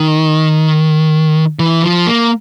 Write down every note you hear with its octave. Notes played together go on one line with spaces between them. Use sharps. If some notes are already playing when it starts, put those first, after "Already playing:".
Already playing: D#3
E3
F3
A#3